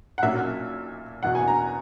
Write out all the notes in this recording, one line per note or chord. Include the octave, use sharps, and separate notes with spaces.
F#5
B1 A#2 F#3 A#3 C#4 E5
F#1 E2 B2 F#5
G#5
A#5